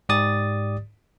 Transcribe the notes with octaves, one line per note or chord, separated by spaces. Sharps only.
G#2 G4 D5 D#6 A6